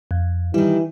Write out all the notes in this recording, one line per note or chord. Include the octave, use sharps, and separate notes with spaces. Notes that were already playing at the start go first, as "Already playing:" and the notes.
F2
D#3 E3 G3 E4